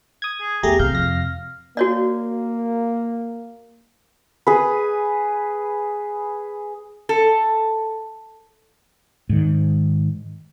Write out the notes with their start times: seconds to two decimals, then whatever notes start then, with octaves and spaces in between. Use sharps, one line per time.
0.22 D#6 G#6
0.41 G#4
0.63 E2 A3 G4 G#4 A#5
0.79 C3 F5 G6
0.94 F2 A#6
1.77 A#3 F#4 C#5 D5
4.47 G#4 B4
7.09 A4
9.29 G#2 D#3